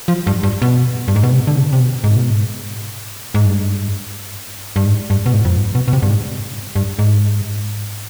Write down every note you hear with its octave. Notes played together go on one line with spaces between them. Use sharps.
F3
G2
G2
B2
G2
G#2
B2
C3
D3
C3
C3
B2
G#2
B2
G#2
G#2
G2
G2
G#2
G2
B2
G#2
F2
G2
B2
B2
C3
G2
G#2
G2
G#2